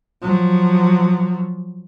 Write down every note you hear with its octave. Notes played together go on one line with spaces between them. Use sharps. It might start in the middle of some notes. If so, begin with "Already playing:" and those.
F3 F#3